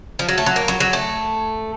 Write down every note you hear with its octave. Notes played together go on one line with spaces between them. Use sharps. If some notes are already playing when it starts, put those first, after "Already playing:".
F3
F#3
A3
F#3
A#3
F#3
F#3
A3